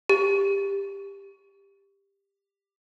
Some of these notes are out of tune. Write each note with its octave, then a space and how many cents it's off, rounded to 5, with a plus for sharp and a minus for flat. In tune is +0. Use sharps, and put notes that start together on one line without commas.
G4 +15